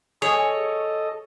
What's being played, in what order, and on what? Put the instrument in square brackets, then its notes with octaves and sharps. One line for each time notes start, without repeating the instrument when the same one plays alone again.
[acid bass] G#4 [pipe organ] A4 D#5 [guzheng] C#5